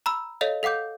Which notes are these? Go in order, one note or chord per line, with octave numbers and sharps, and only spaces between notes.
A#5 B5 E6
A4 C#5 D#5 F5
A4 F5 F#5 D6 G6